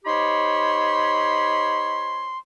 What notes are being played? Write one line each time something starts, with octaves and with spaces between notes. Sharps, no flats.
D#4 G4 C5 C#5 B5 C6